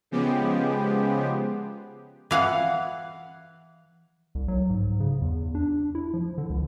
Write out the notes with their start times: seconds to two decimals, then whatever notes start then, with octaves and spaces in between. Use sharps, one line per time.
0.11 C#3 F3 G#3 B3 G4
2.31 E3 F5 F#5
4.35 C2
4.48 F#3
4.70 G#2
5.00 C#3
5.22 E2
5.55 D4
5.95 E4
6.14 F3
6.38 D3
6.50 C#2